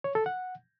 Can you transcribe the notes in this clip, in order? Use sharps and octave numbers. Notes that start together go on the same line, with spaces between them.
C#5
A4
F#5